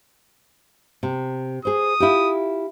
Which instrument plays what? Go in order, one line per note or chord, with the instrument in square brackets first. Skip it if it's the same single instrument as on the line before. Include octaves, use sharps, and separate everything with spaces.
[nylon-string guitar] C3
[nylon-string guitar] G#4 C5 [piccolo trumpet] D#6
[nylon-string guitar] E4 F4 G4